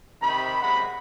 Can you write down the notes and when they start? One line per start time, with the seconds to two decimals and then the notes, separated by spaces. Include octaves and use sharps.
0.22 C3 D#3 B5
0.62 F#2 C3 G#3 F#5 B5